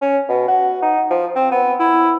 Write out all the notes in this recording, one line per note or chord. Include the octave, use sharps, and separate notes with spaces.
C#4
B2
F#4
D#4
F3
C4
B3
E4